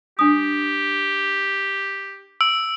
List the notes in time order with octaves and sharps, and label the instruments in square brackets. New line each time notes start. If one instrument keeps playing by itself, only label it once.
[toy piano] D4 D#6 [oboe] G4
[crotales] E6 D7